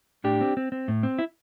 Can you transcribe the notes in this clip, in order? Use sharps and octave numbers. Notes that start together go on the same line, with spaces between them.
A2 D4 G4
C4
C4
C4
A2
C4
E4